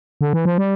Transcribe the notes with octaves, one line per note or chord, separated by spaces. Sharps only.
D3
E3
F3
G3